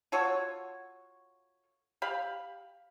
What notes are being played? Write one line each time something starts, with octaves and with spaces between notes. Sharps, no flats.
F4 F#4 A4 C#5
G4 F5 B5